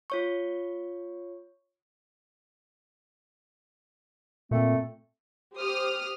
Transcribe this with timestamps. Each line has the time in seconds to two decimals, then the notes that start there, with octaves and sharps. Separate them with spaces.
0.10 F4 C#5 C#6
4.51 A#2 A3 C4
5.55 G4 C5 D#6 F6